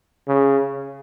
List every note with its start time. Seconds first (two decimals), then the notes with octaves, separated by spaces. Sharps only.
0.28 C#3